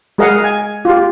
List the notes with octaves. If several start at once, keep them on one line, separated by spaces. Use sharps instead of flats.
G#3 G#4 A#4 D#5 F5 F#5
G#5
F4 G4